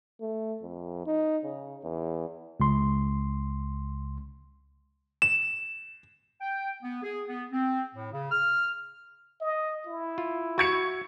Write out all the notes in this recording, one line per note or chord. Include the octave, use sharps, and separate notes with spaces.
A3
F2
D#4
C#3
E2
C#2 C6
E7
G5
B3
G#4
B3
C4
A2
C#3
F6
D#5
E4
F4
F#4 E5 C#6 G#6 C#7